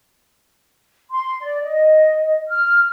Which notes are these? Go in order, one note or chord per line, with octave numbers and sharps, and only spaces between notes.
C6
D5
D#5
F6